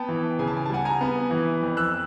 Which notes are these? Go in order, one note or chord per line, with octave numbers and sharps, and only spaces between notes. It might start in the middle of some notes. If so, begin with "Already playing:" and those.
Already playing: B3 G5 A5
E3
C#3 G#5
A5
G#5
A5
G3 F#5 G#5
G#5 A#5
B3
E3
F2
E6 F#6